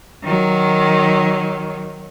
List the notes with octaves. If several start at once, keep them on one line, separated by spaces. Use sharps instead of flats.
D#3 F#3